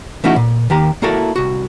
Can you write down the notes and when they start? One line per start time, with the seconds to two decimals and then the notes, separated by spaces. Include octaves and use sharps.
0.24 E3 A3 C#4 D#4 E4 F#4
0.36 A#2
0.70 D#2 D#3 G4 A#5
1.02 A#3 E4 F#4 A4 A#4 D5
1.36 C2 F#4